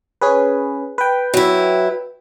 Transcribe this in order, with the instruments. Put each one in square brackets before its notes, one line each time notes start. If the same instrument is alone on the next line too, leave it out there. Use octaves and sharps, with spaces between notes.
[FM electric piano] C#4 G#4 B4
B4 G5
[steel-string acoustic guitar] F#3 E4